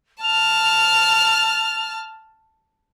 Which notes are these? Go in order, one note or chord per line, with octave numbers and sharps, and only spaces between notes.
A5 F6 F7